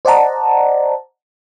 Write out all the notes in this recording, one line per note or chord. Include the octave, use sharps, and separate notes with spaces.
C5 D5 D#5 F#5 A5 A#5